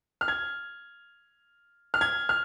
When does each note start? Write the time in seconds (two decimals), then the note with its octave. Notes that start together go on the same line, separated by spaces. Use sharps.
0.21 F6
0.28 G#6
1.94 F6
2.01 G#6
2.29 F6